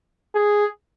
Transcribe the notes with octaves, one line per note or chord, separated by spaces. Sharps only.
G#4